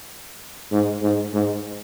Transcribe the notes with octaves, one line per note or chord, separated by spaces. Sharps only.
G#2
G#2
G#2